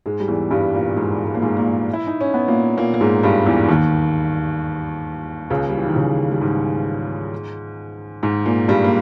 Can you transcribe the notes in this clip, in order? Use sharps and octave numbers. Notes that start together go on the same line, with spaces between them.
G#2 G#3
G3
E2 E3
G2 G3
A#2 A#3
G#2 G#3
G#3
A#3
G#2 G#3
A#2 A#3
E4
D#4
C#4
B3
A#2 A#3
A#2 A#3
A#3
G#2 G#3
G2 G3
E2 E3
D#2 D#3
C#2 C#3
G3
E3
D#3
C#2 C#3
G3
G#2 G#3
G#2 G#3
A#2 A#3
G2 G3
A#3